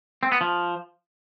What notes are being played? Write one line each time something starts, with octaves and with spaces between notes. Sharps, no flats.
C4
B3
F3